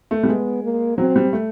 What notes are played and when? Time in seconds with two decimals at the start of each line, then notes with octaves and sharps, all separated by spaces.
0.11 A3
0.23 G3
0.28 G#3 B3
0.63 A#3
0.98 F#3 C4
1.16 G3
1.33 A3